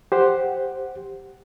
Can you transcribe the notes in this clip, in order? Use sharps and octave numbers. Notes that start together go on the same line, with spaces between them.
G4 C5 F#5